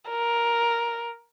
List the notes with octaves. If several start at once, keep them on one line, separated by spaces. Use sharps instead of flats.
A#4